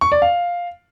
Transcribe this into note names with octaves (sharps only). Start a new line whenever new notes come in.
C#6
D5
F5